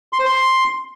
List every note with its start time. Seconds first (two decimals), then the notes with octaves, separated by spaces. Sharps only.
0.13 C6
0.19 C5
0.26 C6